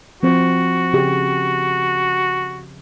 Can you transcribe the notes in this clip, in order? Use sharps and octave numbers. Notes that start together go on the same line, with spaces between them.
F3 C4 F#4 C5
C#3 G4 G#4